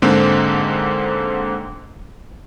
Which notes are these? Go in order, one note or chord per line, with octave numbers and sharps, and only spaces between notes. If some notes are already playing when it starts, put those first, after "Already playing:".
G#2 D3 G#3 A#3 C4